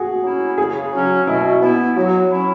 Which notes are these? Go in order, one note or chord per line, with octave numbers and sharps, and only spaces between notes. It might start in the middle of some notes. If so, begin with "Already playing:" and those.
Already playing: F#4 G#4
F#3 C#4 E4
C#3 G#4
F#3 C#4
B2 E4
B3 E4
F#3 F#4
C#4 E4